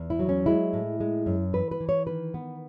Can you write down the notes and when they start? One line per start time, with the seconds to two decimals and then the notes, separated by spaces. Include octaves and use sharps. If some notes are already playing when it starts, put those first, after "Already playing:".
Already playing: E2
0.10 E4
0.19 F#3
0.29 C#4
0.46 G#3 E4
0.73 A2
1.00 G#3
1.26 F#2
1.53 E3 B4
1.71 B4
1.80 E3
1.89 C#5
2.07 D#3 B4
2.34 B3